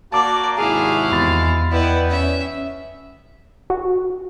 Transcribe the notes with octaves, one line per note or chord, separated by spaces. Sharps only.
A#3 F#4 D5 A5 D6
G#1 C3 E4 F#4 G#4 F5
E2 G#3 B5 A6
B3 E4 B4 D5 D#5 G5
C#4 E5
F#4